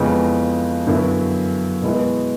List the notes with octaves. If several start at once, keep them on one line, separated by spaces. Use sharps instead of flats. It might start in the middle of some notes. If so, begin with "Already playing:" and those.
Already playing: F2 C#3 E3 G#3 B3
F#2 D3 F#3 B3 E4
B2 G#3 B3 E4